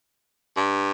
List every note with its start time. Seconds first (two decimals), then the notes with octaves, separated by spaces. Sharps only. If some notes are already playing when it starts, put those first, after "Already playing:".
0.57 G2